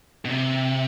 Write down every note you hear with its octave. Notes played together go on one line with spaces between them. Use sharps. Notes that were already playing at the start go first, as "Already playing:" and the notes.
B2
C3